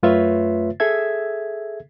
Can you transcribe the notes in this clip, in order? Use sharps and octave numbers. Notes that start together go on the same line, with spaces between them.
F#2 A3 F4 B4 C#5 E5
G#4 A4 E5 G#6